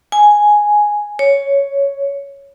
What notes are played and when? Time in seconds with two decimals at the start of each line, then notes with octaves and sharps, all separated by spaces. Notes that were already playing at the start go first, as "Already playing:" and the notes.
0.12 G#5
1.19 C#5